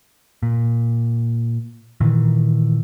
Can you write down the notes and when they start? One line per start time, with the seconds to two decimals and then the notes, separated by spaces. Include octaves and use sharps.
0.43 A#2
2.01 A#2 D#3 E3